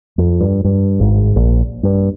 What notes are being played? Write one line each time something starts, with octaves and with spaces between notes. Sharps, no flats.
F2
G2
G2
G#1 G#2
A#1 A#2
G2